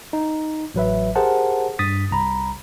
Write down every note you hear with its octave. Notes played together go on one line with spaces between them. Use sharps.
D#4
A1 F#3 B4 E5
G4 G#4 A#4 C5 F#5 A5
G2 D#6 A6 B6
C2 A#5 B5